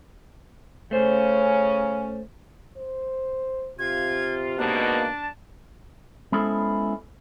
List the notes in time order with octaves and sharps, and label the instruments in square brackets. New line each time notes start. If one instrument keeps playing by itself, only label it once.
[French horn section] C#3 C#4 [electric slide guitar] A3 C5
[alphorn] C5
[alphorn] C3 [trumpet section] F4 [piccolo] G#6
[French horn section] G#2 B2 A#3 [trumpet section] D4 A5 [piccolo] F#6
[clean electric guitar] G#3 B3 C#4 E4 A4 C5